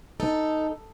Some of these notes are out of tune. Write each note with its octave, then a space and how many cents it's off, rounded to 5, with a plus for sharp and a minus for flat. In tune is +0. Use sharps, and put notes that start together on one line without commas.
D#4 +0 A4 +0